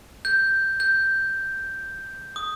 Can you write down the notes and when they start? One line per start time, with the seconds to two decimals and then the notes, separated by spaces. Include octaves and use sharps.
0.25 G6
0.80 G6
2.36 D#6